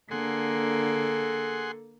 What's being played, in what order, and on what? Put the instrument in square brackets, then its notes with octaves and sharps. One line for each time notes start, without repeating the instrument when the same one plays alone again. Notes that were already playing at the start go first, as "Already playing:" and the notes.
[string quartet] D3 [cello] A#3 [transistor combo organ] G#4 F#5 C6 [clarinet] A4